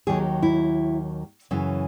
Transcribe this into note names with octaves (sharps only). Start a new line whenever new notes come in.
D#2 D#3 F#3 G#4
E4
F#2 C#3 E3